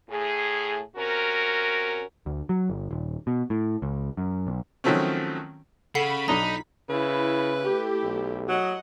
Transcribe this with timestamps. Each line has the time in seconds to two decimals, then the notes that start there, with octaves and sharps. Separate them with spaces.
0.10 A2 G#4
0.96 C3 C#4 F#4 A#4
2.26 D2
2.49 F#3
2.70 G1
2.91 D#1
3.27 B2
3.50 A2
3.82 C#2
4.17 F#2
4.47 B1
4.84 D#3 F3 F#3 A3 C4 C#4
5.95 C#3 A4 F#5 B5 C7
6.28 B1 D4 D#4 A#5 D#6
6.90 C#3 E4 B4
7.64 A3 E4 G4
8.03 B1
8.48 F#3 D#5 F#5